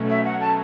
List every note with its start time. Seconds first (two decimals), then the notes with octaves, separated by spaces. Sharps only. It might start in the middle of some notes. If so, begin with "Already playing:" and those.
Already playing: B2 F#3 A3 C#4
0.10 E5
0.25 F#5
0.41 A5